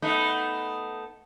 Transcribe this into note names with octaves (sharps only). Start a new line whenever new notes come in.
A3 B3 D#4